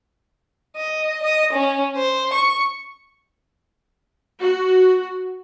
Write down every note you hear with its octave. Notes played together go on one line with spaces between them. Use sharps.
D#5
D#5
C#4
C5
C#6
F#4